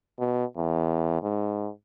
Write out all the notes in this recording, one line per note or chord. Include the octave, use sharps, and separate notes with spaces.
B2
E2
G#2